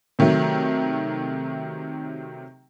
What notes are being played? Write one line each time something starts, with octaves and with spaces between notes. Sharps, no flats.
C3 D#3 F#3 A3